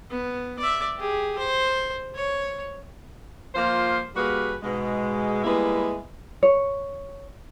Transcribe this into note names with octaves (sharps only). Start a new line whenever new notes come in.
B3
D5 E5
G4 G#4
C5
C#5
F3 A#3 F4 C5
G3 A#3 F#4 G#4 B4
G#2 B2 G#3
G3 G#3 A#3 B3 E4
C#5